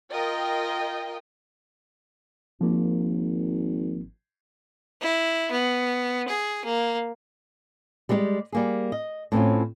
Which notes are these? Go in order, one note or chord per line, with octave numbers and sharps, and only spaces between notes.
F4 A#4 D#5 G5
G#1 F3 A#3
E4
B3
G#4
A#3
G3 G#3 G4 A#4 D5
G3 A#3 G#4
D#5
A2 C4 C#4 F4